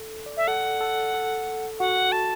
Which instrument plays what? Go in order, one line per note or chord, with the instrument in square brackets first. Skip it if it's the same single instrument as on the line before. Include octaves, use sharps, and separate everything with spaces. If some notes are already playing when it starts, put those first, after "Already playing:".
Already playing: [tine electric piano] A4
D5
[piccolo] E5
[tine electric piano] A4 [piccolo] F#5
[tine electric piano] A4
A4
[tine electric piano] F#4 [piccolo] F#5
[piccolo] A5